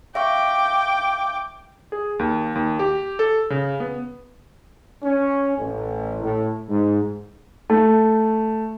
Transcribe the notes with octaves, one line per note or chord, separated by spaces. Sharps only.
E5 F5 G5 C#6 D6
G#4
D#2
D#2
G4
A4
C#3
B3
C#4
A1
A2
G#2
A3